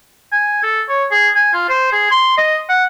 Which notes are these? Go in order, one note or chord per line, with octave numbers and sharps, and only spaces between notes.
G#5
A4
C#5
G#4
G#5
F4
C5
G#4
C6
D#5
F#5